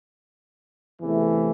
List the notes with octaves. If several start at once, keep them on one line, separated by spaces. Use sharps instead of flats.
E2 C3 E3 A3